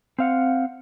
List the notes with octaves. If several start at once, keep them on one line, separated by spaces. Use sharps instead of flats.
C4 F5 F#5